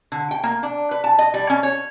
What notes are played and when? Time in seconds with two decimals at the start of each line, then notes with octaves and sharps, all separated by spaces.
0.12 D3
0.31 G5
0.44 A#3
0.63 D4
0.91 B4
1.04 A5
1.19 D#5
1.34 G3
1.50 C#4
1.63 C#5